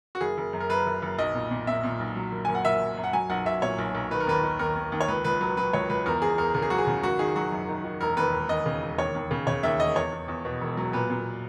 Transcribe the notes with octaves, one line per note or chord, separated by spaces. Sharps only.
F#4
F#1 G#4
F#1
F#2
A#4
F#2 B4
F#1
F#1
B1 D#5
A#2
A#2
A#2 E5
A#2
B1
F#3
F#1
F#1 G#5
F#5
F#1 E5
F#1
F#2
F#5
F#3 G#5
B1 F#5
B1 E5
A#2 C#5
B1
B1
D#3 B4
A#4
D#2 B4
D#3
D#2 A#4
D#2
D#2
C#5
C#2 B4
C#2 B4
F#3 B4
F#3 B4
C#2 C#5
C#2 B4
E2 A#4
E2 G#4
E2 A#4
C#3 A#4
G#4
F#3 F#4
G#4
C#3
G#1 F#4
D#3 G#4
F#3 F#4
F#2
D#3
D#3
E1 A#4
D#2 B4
E1
D#2 D#5
C#3
E1
D#2 C#5
D#2
C#3
C#3 C#5
D#2 E5
E1 D#5
E2 C#5
E2
E2
B2
E1
F#3
A#2 B4
A#2